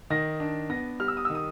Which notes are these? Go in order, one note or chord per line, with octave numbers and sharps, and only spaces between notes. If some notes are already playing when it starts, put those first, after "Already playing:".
D#3 A#6
D4
B3 A#6
G3 F6
E6
D#6
D#3 E6
D#6